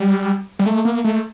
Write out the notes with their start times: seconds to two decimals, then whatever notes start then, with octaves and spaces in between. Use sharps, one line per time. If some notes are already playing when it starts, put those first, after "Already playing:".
Already playing: G3
0.59 G3
0.66 A3
0.85 A#3
1.04 A3